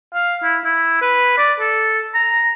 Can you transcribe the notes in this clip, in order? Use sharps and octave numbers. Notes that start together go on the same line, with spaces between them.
F5
E4
E4
B4
D5
A4
A#5